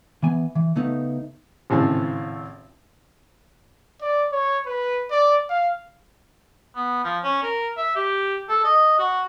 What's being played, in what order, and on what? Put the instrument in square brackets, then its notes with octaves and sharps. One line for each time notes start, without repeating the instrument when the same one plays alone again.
[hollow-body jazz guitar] E3 B3 G#5
E3
C#3 A3 B3 D#4
[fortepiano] G#1 A2 C#3 C4 G#5 A5
[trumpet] D5
C#5
B4
D5
F5
[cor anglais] B3
F3
C#4
A#4
E5
G4
A4
D#5
F#4